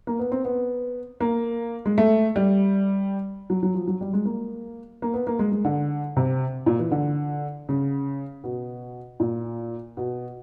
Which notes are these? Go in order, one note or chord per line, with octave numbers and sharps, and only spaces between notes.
A#3
B3
C4
B3
A#3
G#3
A3
G3
F#3
F#3
F3
F#3
G3
G#3
A#3
A#3
B3
A#3
G#3
G#3
D3
C3
A#2
E3
D3
C#3
B2
A#2
B2